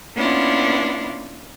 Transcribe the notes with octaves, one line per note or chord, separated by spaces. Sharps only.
A#3 B3 C#4 D4 E4 F4